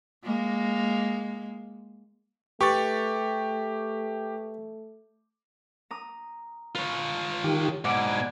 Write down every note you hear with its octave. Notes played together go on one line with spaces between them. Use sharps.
G#3 A#3
A3 G4 B4 C#6 A6
A#5 D#6
F4 B4 C#5
D#3 G4
G#2 B2 D5 F#5 G#5 D6